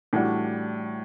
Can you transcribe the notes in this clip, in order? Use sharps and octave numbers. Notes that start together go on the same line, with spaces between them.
A2 E3 G3 D4 F#4